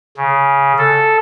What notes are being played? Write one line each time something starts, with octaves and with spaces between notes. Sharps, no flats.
C#3
A4